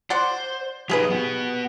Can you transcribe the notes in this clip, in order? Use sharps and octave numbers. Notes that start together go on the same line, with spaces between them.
C5 D5 F#5 C6
F#3 D#4 G4 G#4 B4
B3 F#4